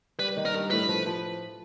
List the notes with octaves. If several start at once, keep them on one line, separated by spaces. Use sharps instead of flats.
G3 B4
D#3
A#4
G2
A2 B4
F3
F3